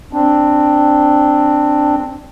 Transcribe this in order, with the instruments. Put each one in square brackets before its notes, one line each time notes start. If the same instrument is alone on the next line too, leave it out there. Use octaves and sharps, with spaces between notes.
[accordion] C4 D4